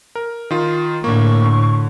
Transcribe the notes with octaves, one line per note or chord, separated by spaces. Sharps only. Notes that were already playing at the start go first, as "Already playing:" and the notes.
A#4
D#3 F4
A2 D3 A#3 C#6
D3